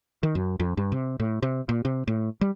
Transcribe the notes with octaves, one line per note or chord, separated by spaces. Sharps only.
D#3
F#2
F2
G2
C3
A2
C3
A#2
C3
A2
G3